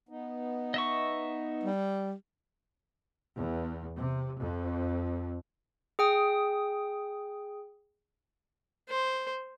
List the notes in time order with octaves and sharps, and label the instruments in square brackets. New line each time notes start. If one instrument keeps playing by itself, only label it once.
[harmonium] B3 D#4
[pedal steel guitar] D#5 E5 C#6
[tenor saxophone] G3
[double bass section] E2
C3
F2
[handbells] G#4 G5 D#6
[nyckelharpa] C5